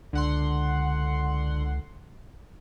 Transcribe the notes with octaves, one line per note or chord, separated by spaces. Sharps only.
C#2 D3 F#5 C6